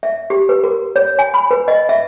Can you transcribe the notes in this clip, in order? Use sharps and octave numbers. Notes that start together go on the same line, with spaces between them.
E5
G4
B4
A#4
C#5
G#5
B5
B4
D#5
E5